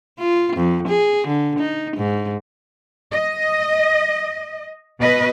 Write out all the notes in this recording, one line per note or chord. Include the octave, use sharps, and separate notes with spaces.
F4
F2
G#4
D3
D#4
G#2
D#5
B2 B4 D#5